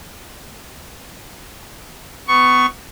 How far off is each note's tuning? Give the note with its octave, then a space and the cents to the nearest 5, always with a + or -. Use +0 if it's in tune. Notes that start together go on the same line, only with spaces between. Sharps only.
B3 +30 C#6 +0